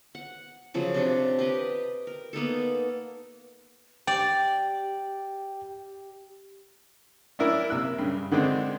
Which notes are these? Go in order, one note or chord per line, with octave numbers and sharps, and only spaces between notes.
F#5
C#3 F3 F#3
C3 D4 F#4
G4 B4 D#5
A#4
A#3 B3 D#4 A4
G4 D5 G5
C#4 D4 E4 A#4
C3 A#3 E6 F#6
G2 C#3
D3 D#3 G#3 C4 D4